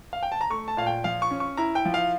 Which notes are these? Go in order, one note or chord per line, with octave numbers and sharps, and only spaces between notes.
F5
G5
A5
A#5
A3 C#6
A5
A#2 F5
G5
F3 F5
C#6
C#4
C#6
E4 A#5
G5
F3
F5